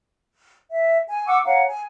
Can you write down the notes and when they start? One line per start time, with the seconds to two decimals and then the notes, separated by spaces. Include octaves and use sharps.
0.71 E5
1.08 G#5
1.27 F#5 C#6 D6 E6
1.45 C#5 F5 F#5 A#5
1.67 G#5